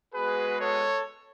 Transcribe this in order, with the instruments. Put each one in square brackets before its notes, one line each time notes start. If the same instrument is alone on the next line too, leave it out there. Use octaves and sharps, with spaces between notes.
[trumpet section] G#3 B3 F#4 G#4 B4
A4 C#5